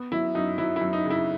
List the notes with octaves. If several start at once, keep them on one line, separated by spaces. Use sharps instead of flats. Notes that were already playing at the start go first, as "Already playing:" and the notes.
Already playing: B3
F#3 E4
F#2 D#4
F#3 E4
E4
F#2
D#4
C#3
E4